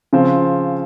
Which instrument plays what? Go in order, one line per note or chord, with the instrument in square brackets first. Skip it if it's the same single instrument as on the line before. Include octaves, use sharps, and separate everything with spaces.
[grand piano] C#3 F3 C4